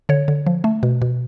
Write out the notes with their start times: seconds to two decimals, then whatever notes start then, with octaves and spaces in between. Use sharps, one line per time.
0.09 D3 C#5
0.28 D3
0.47 F3
0.64 A3
0.83 B2
1.02 B2